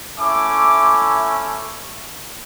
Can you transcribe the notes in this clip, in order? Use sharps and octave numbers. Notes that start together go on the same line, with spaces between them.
A3 C#4 E4 D6